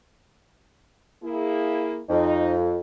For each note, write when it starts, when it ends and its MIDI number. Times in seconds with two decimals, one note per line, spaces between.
1.23 2.01 58
1.23 2.01 64
1.23 2.01 68
2.10 2.79 41
2.10 2.55 63